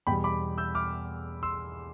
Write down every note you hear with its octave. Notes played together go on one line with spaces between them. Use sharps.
E2 B2 G3 G5 B5
B5 D6
E6 G6
D6 F6
C6 E6